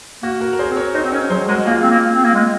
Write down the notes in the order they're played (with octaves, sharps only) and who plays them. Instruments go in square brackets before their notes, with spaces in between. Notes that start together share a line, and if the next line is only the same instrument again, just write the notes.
[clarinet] A#3 [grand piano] F#4
[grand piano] F#4 A#4
A#4
G#4 C5
[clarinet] C4
[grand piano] A#4 C#5
[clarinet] D#4 [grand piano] C5 D#5
[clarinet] C4
[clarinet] C#4 [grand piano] A#4 C#5
[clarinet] F#3 [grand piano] G#4 C5
[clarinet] G#3 [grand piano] F#4 A#4
[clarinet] A#3 [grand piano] F4 G#4
[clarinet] C4
A#3
C4
A#3
G#3